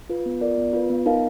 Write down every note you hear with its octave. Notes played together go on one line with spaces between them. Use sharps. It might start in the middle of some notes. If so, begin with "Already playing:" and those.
F4 B4
B3
F4 A#4 D5
B3
F4 B4
B3
D#4 A#4 F5